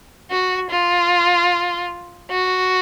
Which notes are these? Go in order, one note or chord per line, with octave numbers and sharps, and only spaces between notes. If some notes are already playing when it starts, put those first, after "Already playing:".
F#4
F4
F#4